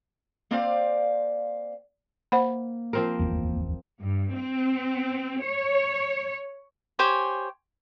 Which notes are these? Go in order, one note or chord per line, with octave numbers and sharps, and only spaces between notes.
A#3 C4 C5 D5 F5
A#3 C5 F#5 B5
F3 C4 A#4
D1 G1 E2
G2
C4
C#5
G4 C5 C#5 G#5